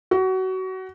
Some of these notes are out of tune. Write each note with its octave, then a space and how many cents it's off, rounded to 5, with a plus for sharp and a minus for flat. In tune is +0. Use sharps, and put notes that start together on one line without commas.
F#4 +25